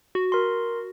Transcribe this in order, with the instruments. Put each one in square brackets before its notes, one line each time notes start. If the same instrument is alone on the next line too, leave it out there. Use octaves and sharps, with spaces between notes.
[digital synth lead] F#4
[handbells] A#4 C6